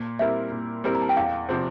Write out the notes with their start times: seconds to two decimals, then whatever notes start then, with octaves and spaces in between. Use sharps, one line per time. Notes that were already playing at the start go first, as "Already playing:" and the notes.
Already playing: A#2
0.19 G3 C4 E4 A#4 E5
0.52 A#2
0.84 G3 C4 E4 A#4
0.95 A#5
1.02 A5
1.09 G5
1.17 E2 F5
1.49 C3 F3 C4